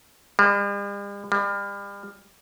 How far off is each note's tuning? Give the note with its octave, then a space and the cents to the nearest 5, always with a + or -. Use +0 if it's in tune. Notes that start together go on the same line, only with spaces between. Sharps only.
G3 +45
G3 +35